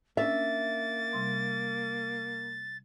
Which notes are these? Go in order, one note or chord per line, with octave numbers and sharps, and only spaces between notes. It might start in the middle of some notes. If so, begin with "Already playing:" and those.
A#3 C#4 D4 E5 A6
C3 G3 C6